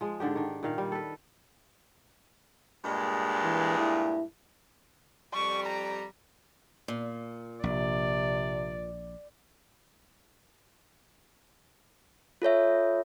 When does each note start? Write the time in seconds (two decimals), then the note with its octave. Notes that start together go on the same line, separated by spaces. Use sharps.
0.01 F3 G#3
0.20 G#2 D3 D4 G4
0.35 D#3 D4
0.63 A#2 D#3 F5
0.78 G3
0.92 A4 B4
2.85 G2 A#2 G#3
3.43 E3
3.78 E4
5.34 F2 G3 C#6
5.67 A#5
6.88 A#2
7.63 A#1 C3 D5
12.42 F4 A4 C#5 E5